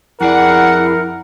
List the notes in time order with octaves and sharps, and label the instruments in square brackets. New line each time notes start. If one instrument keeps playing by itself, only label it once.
[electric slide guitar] F2 G#4 D5 [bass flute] E4 [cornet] A#4 [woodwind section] F#5